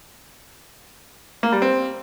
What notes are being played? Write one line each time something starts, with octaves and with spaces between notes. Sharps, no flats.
A#3
G3
C4